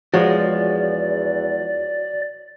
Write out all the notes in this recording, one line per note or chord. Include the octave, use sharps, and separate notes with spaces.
E2 F3 G#3 F#4 C#5 D5